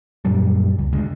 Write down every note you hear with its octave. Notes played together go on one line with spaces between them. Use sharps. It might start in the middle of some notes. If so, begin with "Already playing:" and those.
F#2 A#2 F#3 G3
C#2
D2 G#3